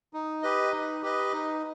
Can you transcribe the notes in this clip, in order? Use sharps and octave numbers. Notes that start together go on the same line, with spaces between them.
D#4
G4 B4 D#5
D#4
G4 B4 D#5
D#4